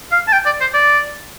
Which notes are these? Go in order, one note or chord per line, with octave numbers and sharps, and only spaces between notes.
F5
A5
G5
D5
C5
D5